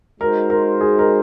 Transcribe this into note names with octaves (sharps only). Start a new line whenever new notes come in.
G#3 D#4 F#4 A#4 C5
A#4
G#4
A#4